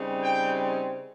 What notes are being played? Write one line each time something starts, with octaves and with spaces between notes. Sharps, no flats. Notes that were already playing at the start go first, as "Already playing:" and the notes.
Already playing: C#3 G3 C4 D#4
G5